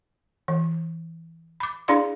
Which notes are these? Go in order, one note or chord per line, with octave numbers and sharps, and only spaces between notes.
E3
B5 D6
D4 E4 G#4 D5 F5 C6